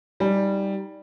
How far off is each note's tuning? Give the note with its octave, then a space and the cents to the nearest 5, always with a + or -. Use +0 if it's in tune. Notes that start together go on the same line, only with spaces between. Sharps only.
G3 +0 D#4 +20 G#5 +0